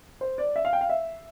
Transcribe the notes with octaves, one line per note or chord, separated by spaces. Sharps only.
C5
D5
E5
F5
G5
F5
E5